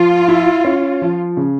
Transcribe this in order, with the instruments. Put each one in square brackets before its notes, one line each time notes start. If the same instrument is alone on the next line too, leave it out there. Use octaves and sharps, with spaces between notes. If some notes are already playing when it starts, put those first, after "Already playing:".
Already playing: [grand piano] F3 [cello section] F4
[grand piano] E4
C#4
F3
C#3